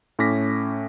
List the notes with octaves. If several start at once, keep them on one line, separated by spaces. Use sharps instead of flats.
A2 C#4 D6 A#6 B6